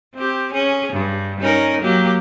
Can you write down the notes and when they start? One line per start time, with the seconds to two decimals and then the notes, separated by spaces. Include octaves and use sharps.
0.15 C4 G4
0.53 C#4 G#4
0.93 G2
1.41 C#4 D#4 A#4
1.82 F#3 A#3 G4